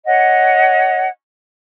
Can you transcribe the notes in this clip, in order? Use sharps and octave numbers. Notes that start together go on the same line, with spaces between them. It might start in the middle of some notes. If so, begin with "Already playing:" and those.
C#5 D#5 F#5